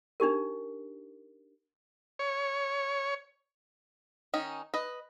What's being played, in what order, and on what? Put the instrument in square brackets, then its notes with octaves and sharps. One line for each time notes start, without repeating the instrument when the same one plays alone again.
[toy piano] D4 D#4 G4 A#4
[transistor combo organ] C#5
[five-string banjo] D#3 C#4 D#4
B4 D#5